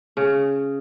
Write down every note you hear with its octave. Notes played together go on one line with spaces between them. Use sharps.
C#3